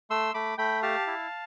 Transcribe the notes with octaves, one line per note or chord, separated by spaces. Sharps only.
A3 C6 E6
A3 B5 D6
A3 G5 B5
G4 F5 A5
E4